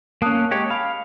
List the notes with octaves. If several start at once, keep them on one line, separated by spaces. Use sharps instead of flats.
A#3 C#4 A5 D#6 F#6
G#3 G4 C#5
F5 B5